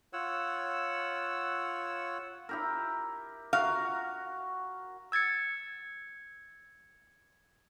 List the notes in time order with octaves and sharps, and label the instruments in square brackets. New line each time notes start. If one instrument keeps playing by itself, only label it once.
[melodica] F4 C#5 F#5 E6
[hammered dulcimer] E4 G4 A#4
[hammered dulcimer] F#4 A#4 [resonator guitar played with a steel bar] F5
[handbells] E6 G#6 A6 C#7